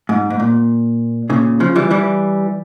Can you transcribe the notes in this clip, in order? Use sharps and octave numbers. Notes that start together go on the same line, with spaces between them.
G#2
G#2
A#2
A#2 C#3
C#3 F3
E3 G3
E3 G3